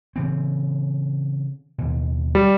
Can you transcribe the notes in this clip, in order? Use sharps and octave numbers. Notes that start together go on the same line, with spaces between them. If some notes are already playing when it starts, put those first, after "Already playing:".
C#3 E3 C4
D#2 B2
G3